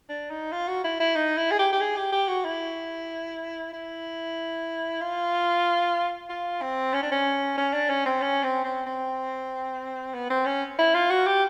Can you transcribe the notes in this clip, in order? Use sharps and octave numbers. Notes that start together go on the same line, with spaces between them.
D4
D#4
F4
F#4
E4
E4
D#4
E4
G#4
G4
G4
G#4
G4
G4
F#4
E4
E4
F4
F4
C4
C#4
D4
C#4
C#4
D4
C#4
C4
C#4
C4
C4
C4
B3
C4
C#4
E4
F4
F#4
G4